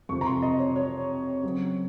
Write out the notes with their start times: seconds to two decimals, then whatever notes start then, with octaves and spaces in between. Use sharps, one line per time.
0.09 F2 C3 F3 C#6
0.21 A#5
0.26 C6
0.42 D#5
0.59 C#5
0.76 C#5
1.43 C#3 F#3 C4